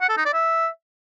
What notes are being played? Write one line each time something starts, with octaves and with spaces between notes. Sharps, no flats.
F#5
A4
D#4
D5
E5